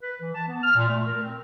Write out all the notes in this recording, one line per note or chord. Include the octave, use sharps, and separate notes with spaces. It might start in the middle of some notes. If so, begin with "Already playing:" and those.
B4
E3
A5
B3
F6
A#2
A3
A#4
C4